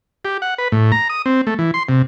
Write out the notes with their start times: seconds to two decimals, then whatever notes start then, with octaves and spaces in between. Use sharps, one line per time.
0.25 G4
0.42 F#5
0.58 B4
0.72 A2
0.92 A#5
1.09 D#6
1.26 C4
1.47 A3
1.59 E3
1.74 C6
1.89 C3